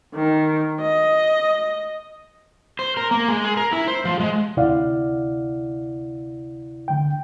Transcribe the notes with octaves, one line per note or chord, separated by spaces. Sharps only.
D#3
D#5
C5
A#4
A#3
G#3
G#4
A#4
E4
C5
F3
G#3
D2 C3 E4 D5 F5 F#5
D3 G5